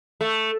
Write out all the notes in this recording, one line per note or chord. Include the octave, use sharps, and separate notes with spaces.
A3